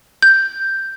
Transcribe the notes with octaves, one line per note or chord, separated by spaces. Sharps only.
G6